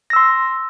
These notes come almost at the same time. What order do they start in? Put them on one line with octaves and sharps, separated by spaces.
A#6 E6 C6